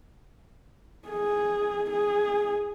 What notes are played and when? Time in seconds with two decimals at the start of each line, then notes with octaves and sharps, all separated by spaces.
1.08 G#4
1.91 G#4